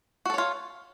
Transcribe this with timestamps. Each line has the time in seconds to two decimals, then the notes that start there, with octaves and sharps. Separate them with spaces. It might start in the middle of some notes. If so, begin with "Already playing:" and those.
0.26 F#4
0.30 A4
0.34 C#5
0.38 F4